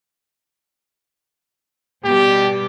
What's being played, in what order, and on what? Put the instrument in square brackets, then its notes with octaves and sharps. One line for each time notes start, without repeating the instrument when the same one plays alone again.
[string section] B2 G3 [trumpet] G4